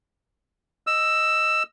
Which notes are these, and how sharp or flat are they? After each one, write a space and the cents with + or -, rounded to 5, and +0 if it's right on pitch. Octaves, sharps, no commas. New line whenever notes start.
D#5 +0 E6 +10